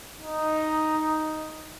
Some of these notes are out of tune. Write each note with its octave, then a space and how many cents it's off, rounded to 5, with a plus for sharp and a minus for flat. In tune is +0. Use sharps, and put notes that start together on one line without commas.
D#4 +0